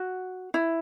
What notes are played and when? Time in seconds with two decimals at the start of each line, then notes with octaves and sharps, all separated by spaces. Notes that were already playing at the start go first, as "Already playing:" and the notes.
Already playing: F#4
0.54 E4